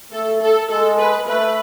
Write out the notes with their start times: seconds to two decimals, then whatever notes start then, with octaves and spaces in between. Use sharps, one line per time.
0.12 A3 A4
0.42 A4
0.70 G#3 A4
0.99 B4
1.28 A3 B4